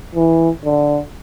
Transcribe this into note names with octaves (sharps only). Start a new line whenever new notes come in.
E3
D3